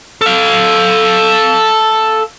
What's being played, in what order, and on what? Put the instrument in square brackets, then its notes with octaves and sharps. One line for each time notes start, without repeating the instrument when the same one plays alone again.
[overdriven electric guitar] A4 F5